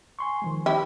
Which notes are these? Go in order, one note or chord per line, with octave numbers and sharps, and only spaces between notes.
G#5 C6 C#6
D#3 F3 G#3
D#4 E4 G4